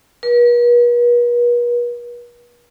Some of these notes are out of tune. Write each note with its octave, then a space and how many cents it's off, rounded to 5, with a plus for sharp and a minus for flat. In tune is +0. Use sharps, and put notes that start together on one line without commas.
B4 -45